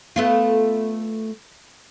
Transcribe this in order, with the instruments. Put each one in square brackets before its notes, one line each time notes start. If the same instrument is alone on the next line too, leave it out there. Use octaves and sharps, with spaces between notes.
[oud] A3 B3 F4